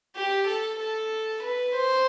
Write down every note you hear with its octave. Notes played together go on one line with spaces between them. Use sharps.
G4
A4
A4
B4
C5